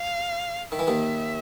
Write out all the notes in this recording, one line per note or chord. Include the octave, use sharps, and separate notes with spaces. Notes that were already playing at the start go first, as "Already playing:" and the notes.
Already playing: F5
D#3 E5
E3
D#2 D#3